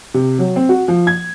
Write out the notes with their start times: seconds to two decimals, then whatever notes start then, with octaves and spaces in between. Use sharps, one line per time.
0.14 C3
0.39 F#3
0.56 C4
0.69 F#4
0.88 F3
1.07 G#6